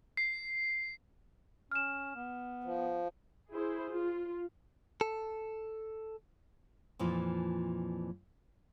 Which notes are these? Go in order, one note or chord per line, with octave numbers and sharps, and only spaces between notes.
C7
C#4 F6 E7
B3
F3
E4 G#4 C5
F4
A4
F2 A#2 E3 F3